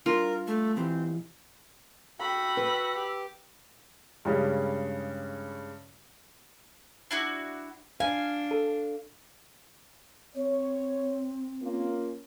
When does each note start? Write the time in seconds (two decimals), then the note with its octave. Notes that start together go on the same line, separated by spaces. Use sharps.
0.06 G3 D4 F4 A#4 C6
0.47 A3
0.76 B1 E3 C4 G4
2.19 F#4 G5 B5 E6
2.57 B4
2.95 G4
4.25 G2 C#3 G3 G#3 C#4
7.11 D4 E4 F#4
8.00 D4 F5 G#5
8.51 A4
10.35 C4 C#5
11.61 A#3 C#4 F4